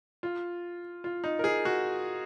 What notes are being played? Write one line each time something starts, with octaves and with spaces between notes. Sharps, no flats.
F4
F4
D#4
A#4
G#4
F#4